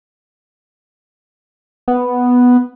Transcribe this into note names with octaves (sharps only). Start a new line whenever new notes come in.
B3